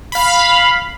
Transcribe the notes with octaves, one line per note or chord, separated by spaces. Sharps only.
F5 B5